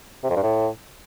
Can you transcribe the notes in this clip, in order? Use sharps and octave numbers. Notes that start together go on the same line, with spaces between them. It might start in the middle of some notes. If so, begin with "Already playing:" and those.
C3
F2
G2
A2